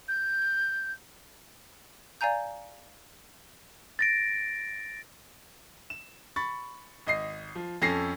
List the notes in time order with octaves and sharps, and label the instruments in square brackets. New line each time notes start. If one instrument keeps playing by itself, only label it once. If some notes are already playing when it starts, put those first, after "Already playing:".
[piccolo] G6
[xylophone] D5 F5 G#5 A#5 G6
[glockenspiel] A6 A#6 D7
[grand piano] E7
B5 C#6 A6
G#1 D#5 C7
F3
F2 C#4 A4 A#6 C7